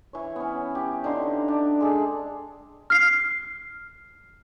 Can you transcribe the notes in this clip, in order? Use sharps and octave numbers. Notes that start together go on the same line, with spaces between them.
E3 C#5
B3 C#4
G4
D3 D#4 A#5 C6
D4
G#3 G#4 A4
F6 C7